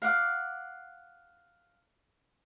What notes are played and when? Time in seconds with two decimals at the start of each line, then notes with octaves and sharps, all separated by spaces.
0.02 F5 F#5 D6